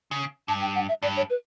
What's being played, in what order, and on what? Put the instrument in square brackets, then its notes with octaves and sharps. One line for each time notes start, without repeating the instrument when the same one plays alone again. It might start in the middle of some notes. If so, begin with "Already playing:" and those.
[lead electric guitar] C#3
[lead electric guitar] G2 [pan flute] A5
[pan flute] G5
F#5
E5
[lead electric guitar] G2 [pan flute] D5
[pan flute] C#5
B4